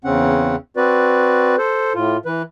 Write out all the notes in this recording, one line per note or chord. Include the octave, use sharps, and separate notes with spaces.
E2 C#3 C4 C#4 F#5
C4 F#4 B4 D5
A4 C5
A2 F4
E3 B4